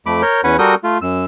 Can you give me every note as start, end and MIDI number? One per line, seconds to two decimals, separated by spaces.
0.06 0.22 41
0.06 0.22 57
0.06 0.22 83
0.06 0.22 86
0.22 0.41 70
0.22 0.41 73
0.22 0.41 91
0.44 0.57 40
0.44 0.57 61
0.44 0.57 71
0.44 0.57 78
0.44 0.57 80
0.44 0.57 83
0.59 0.75 55
0.59 0.75 66
0.59 0.75 69
0.59 0.75 70
0.59 0.75 87
0.59 0.75 91
0.84 0.98 57
0.84 0.98 65
1.02 1.25 42
1.02 1.25 88